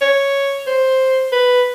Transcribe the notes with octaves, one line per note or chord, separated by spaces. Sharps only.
C#5
C5
B4